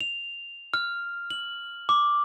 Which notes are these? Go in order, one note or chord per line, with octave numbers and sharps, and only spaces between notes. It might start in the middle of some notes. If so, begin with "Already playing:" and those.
F7
F6
F#7
D6